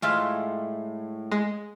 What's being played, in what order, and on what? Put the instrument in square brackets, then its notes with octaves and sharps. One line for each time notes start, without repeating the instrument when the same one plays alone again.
[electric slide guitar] A2 [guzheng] G#3 F4 E5
[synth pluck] G#3